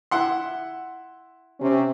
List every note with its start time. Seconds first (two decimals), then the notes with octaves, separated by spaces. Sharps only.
0.11 E4 F#5 C6
1.60 C3 C#4